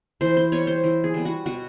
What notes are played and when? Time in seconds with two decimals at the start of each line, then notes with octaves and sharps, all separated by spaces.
0.21 E3 C5
0.37 C5
0.52 G3 B3 C#5
0.67 C5
0.84 E3
1.04 G#4
1.14 G3 B3
1.25 F#4
1.46 B2 F#4